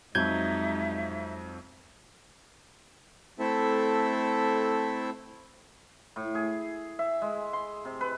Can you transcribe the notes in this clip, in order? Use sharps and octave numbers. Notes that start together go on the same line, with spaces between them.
F2 F#3 G#3 D#4 E5 G6 G#6
A3 C4 E4 A4 E5
A2
G#4
E5
G#3
C6
C3
B4